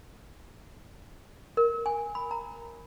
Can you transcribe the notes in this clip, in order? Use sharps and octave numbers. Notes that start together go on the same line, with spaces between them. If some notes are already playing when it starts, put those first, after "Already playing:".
A#4
G#5
B5
A#5